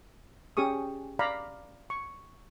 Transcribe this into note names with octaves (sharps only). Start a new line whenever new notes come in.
C#4 G4 G#4 C#6 D#6
D5 F5 A#5 B5
C#6